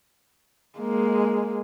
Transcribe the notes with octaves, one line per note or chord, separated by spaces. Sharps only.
G#3 A#3